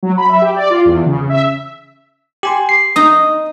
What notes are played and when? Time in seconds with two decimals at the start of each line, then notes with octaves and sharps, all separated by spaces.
0.03 F#3
0.18 B5
0.29 E5
0.42 G4
0.56 D5
0.70 F4
0.86 E2
1.06 C#3
1.29 E5
2.43 G4 G#5 C6
2.69 C7
2.96 D#4 A#5 D#6